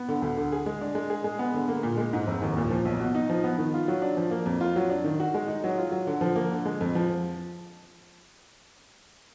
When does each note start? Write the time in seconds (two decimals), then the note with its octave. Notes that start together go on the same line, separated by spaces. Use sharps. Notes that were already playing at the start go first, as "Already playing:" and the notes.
Already playing: B3
0.08 D3
0.22 D2
0.37 D3
0.52 G#4
0.66 G#3
0.81 D4
0.95 G#3
1.10 G#4
1.24 G#3
1.39 B3
1.54 D3
1.68 A#3
1.83 A#2
1.97 G#3
2.13 G#2
2.27 F1
2.42 D#2
2.57 A#2
2.71 F3
2.85 B1
3.00 B2
3.15 D#4
3.30 F3
3.44 B3
3.58 D#3
3.74 F4
3.88 F#3
4.02 D4
4.17 F3
4.31 A#3
4.46 F2
4.61 F4
4.76 F#3
4.90 D4
5.04 D#3
5.20 F#4
5.35 G#3
5.48 D#4
5.64 F#3
5.78 F4
5.92 F#3
6.07 D3
6.21 F3
6.36 A#3
6.51 D3
6.66 G#3
6.81 F2
6.95 F3